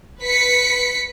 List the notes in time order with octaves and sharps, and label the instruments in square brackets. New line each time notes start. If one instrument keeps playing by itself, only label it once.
[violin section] B4 B6 C#7